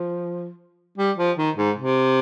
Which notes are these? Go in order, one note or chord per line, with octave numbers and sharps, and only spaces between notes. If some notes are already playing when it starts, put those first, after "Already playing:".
Already playing: F3
G3
F3
D#3
G#2
C3